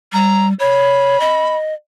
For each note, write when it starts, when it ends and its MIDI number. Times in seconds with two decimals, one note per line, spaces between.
0.13 0.53 55
0.13 0.46 82
0.60 1.19 73
0.60 1.56 83
1.20 1.74 75